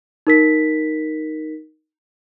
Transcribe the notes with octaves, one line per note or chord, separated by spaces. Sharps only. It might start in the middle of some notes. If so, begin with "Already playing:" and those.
D#4 A#4 B6